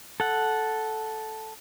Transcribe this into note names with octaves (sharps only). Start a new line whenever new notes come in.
A4 F#5